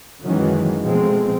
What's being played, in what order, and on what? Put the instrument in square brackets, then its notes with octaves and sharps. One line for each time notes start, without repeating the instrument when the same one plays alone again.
[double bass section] F#2 D#3 E3 F#3 G#3 C#4
B2 F3 G#3 A3 C4